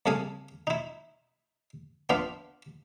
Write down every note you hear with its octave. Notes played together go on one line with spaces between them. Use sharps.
C2 C#3 A4 F5 G#5 D#6
D#4 E4
B3 D4 F4 B4 E5 F5